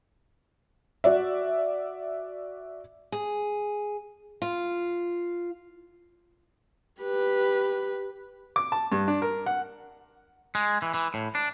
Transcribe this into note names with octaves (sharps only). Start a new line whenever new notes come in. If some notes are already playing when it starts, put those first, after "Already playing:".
F#4 D5 E5
G#4
F4
G4 B4
D6
A5
G2
D4
A#4
F#5
G#3
E3
E3
A2
D4